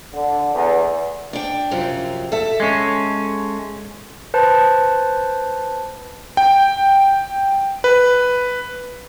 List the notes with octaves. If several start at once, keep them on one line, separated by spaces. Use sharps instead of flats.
D3
E2
D4 G5
F#2 C3 F3
A4 E5
G#3 C#4
B4 C5 A5
G5
B4